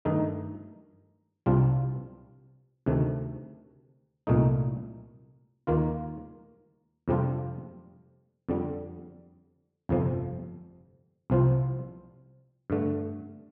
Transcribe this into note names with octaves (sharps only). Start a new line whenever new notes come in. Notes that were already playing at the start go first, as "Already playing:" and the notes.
G2 D#3 A3 D#4
C2 C3 G3 D4 F4
D2 C3 D#3 A3
C2 A#2 A3 D#4
D#2 D#3 A#3 F4
F2 C3 G3 D4 F4
F2 D3 G3
G1 F2 C3 F3
C2 C3 F3 C4 F4
G2 D3 A3